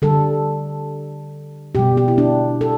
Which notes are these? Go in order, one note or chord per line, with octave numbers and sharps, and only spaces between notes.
D3 G3 A4
B2 G3 G4
G4
E4
D4
A4